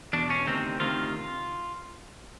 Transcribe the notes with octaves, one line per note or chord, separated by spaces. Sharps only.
E2 B2 D4
C#4
D2 C3 D#3 C4
D2 C3 D#3 F4